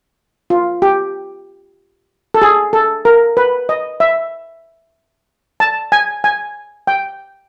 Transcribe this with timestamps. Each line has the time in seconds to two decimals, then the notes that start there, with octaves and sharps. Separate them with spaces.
0.50 F4
0.82 G4
2.34 A4
2.42 G#4
2.73 A4
3.05 A#4
3.37 B4
3.69 D#5
4.00 E5
5.60 A5
5.92 G#5
6.24 G#5
6.87 G5